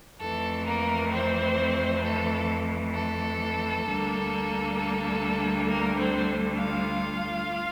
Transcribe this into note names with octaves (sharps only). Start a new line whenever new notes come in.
F2 E3 A3 A4
A#3 A#4
C4 C5
A4
A4
D2 D3 G3 A#3
A4
A#3 A#4
C4 C5
F4 F5